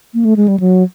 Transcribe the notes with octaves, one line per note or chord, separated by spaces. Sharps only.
A#3
A3
G#3
G3
F#3